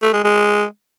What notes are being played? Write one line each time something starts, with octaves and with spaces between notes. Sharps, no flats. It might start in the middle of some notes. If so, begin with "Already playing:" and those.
A3
G#3
G#3